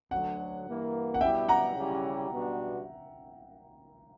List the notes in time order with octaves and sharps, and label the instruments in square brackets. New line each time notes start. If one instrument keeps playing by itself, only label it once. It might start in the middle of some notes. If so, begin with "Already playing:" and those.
[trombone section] D2 D3 F#3 [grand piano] F#5
[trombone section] G2 E3 A#3
[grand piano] F#5
[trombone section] B2 G3 B3 E4 G4 [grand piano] E5 G5
[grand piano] F#5 A#5
[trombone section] C#3 G3 C#4 E4 G4
B2 G3 B3 D4 F#4